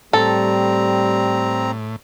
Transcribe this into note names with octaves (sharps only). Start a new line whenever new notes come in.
A2 G3 C4 A4 A#5